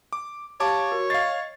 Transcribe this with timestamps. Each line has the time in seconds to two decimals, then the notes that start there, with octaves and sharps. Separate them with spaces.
0.13 D6
0.60 G4 C#5 F5 A5 D6
0.91 F#4 A#4
1.10 D#5 F5 C#6 A6 C7